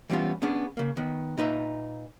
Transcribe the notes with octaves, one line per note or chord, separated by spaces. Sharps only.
E3 G3 B3 C#4 F4
B3 C#4 D4 G#4
C#3 A#3
D#3 B3
A#2 D#4 B4 E5